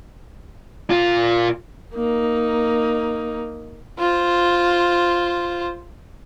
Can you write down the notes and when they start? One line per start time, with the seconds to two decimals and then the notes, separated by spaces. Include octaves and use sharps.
0.90 A#2 F4
1.95 A#3 D#4
3.99 F4 C5